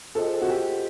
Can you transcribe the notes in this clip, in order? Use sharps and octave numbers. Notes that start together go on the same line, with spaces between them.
F4 G#4 A4 C5 D#5 G5
F#4
G4